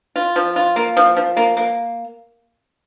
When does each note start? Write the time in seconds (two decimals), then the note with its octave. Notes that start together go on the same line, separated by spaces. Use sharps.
0.16 F4
0.36 F3
0.56 F4
0.76 A#3
0.97 F3
1.17 F3
1.37 A#3
1.57 A#3